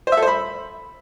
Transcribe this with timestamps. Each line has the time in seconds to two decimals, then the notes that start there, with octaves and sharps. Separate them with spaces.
0.07 C5
0.12 E5
0.17 A4
0.22 C5
0.28 B5